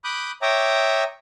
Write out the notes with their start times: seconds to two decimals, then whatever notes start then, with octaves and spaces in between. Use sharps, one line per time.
0.04 B5 D6 D#6 F#6 G6
0.42 C#5 E5 G5 A#5 D6 D#6